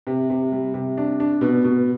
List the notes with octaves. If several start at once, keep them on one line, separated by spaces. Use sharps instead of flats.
C3
C3
G3
C3
D4
D4
B2
B2